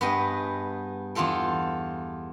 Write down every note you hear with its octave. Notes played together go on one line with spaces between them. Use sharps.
G2 B3 G#4 B4 D#5 G5
E2 D4 F4 A4 G5